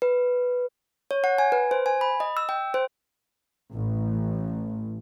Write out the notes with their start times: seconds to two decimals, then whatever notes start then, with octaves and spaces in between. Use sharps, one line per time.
0.02 B4
1.11 C#5
1.24 F#5
1.38 G#5
1.52 B4
1.71 C5
1.86 G#5
2.01 B5
2.20 D#5
2.37 E6
2.49 G5
2.74 C5
3.71 A1